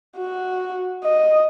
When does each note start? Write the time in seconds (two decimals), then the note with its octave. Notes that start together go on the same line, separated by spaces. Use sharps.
0.17 F#4
1.04 D#5